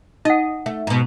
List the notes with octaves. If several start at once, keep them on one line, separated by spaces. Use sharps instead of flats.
D#4 D#5 F#5
A3
G#2 B2